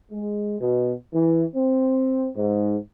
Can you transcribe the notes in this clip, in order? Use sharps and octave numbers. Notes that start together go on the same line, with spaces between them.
G#3
B2
E3
C4
G#2